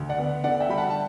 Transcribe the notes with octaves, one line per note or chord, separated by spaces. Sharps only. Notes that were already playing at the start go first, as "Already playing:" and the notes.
Already playing: D2
D5 F#5
B3
D3 D5 F#5
E5 G5
G3 B5
F#5 A5
A5